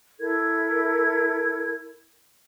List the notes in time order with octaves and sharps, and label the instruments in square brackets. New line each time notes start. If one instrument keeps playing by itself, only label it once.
[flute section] E4 A4 A#4 G#6